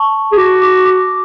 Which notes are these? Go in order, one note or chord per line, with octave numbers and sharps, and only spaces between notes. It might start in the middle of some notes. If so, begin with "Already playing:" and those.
Already playing: A5 C#6
G#4
F#4 D6
D6
D6